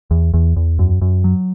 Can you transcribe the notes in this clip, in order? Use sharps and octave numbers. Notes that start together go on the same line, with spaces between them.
E2
E2
E2
F#2
F#2
F#3